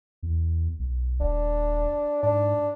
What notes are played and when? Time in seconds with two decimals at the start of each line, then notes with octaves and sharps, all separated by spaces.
0.23 E2
0.79 B1
1.20 D#1 D4
2.23 G#2 D4